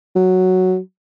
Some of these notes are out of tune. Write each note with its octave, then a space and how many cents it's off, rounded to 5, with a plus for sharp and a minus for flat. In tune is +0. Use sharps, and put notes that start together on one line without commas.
F#3 +0